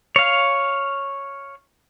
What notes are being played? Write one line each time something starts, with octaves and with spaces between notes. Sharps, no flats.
C#5 F5